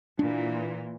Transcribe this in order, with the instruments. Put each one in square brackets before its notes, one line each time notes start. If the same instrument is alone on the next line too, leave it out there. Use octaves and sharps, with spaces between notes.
[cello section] A#2 E3 [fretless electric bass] D4